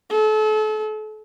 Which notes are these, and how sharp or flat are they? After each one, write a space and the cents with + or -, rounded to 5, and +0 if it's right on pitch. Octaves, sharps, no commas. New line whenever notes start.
A4 -35